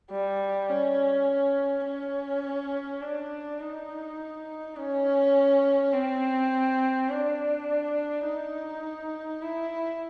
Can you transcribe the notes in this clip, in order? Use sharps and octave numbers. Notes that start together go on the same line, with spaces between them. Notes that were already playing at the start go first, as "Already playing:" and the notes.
G3
C#4
C#4
D4
D#4
C#4
C4
D4
D#4
E4